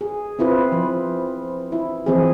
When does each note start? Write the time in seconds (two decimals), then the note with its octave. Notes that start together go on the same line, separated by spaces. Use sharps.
0.01 G#4
0.39 C4 E4 F4 B4
0.72 F3
1.72 E4
2.06 E3 F3 C4 G#4